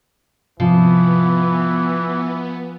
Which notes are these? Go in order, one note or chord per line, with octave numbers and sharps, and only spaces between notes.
G#2 C3 E3 F3 B3 C4